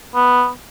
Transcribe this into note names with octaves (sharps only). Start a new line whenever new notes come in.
B3